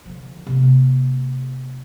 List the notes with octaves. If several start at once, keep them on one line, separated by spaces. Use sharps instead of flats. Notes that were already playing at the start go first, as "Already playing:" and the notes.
D3 F3
C3 A#3